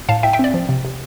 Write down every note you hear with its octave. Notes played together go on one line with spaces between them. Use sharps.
A2 F5 A5
A2 E5 G5
E5 G5
C4 D5
F3
C3
C3